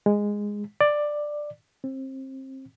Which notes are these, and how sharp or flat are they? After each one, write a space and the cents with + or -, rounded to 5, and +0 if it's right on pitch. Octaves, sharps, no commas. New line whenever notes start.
G#3 -10
D5 +10
C4 +25